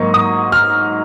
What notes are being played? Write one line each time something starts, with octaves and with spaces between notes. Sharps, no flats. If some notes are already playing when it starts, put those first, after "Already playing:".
Already playing: G#2 F#3 A#3 D#4 C#6
D#6
F6